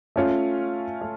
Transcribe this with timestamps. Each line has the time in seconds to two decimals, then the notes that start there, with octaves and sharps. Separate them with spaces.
0.16 A3 C#4 F4
1.01 A3